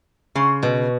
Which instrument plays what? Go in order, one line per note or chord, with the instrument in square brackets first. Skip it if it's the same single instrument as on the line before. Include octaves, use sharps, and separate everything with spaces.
[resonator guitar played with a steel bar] C#3 [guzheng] C6
[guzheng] B2